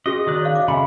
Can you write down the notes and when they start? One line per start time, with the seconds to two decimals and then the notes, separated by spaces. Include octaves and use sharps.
0.06 C#4 F#4 G#4 D#5
0.27 D#3 D5 F#6
0.42 C#5 F5
0.55 D#5 D6
0.68 C#3 A4 E5 G#5 B5